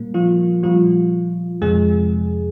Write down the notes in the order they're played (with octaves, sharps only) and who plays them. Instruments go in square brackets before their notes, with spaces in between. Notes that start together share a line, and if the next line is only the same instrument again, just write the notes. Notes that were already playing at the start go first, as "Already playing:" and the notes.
Already playing: [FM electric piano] A#2 G3 A#3
F3 F4
A#2 F3 G3 F4
F2 C3 F3 G#3 G#4